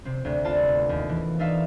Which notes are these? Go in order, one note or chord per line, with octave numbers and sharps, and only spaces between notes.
C3 C4
D2 C3
B3 F4 D5 A5
D#2
E3
D4 D#4 A4 E5 F5